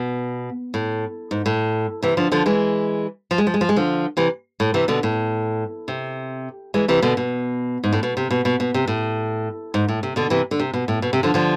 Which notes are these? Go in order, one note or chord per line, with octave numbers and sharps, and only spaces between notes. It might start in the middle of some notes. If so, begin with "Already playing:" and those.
Already playing: B2
A2
G#2
A2
C3 E3
D3 F3
D3 F3
E3 G#3
F3
G#3
F3
G#3
F3
G#3
D3 F3
C3 E3
A2
C3 E3
B2 D3
A2
C3
E3 G#3
C3 E3
B2 D3
B2
G#2
A2
B2
C3
B2
B2
B2
C3
A2
G#2
A2
C3
B2 D3
C3 E3
D3
C3
B2
A2
B2
C3
D3 F3
D3 F3